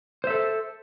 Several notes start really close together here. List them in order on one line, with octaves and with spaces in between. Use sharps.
C5 E5 A4